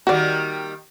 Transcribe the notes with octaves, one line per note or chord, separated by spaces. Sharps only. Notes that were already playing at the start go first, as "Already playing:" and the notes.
D#3 G3 A#3 F#4 D5